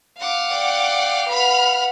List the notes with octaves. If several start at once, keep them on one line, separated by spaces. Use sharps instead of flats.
F5 F#5 D6
D5 G5
B4 F#5 B5 F6